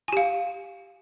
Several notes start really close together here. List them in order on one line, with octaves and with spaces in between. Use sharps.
G#5 G4 F5